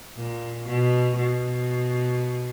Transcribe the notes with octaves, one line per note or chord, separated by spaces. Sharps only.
A#2
B2
B2